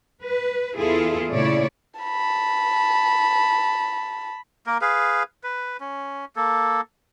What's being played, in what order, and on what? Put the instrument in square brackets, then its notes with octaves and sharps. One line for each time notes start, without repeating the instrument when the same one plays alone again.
[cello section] B4
E2 E4 F4 G#4 A4
A#2 C#3 A3 E4 C#5 D5
[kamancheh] A5 B5
[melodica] A#3 A#4
G#4 B4 F5
B4
C#4
A#3 A4